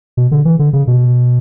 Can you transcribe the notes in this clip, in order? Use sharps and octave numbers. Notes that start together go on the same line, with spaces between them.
B2
D3
E3
D3
C#3
B2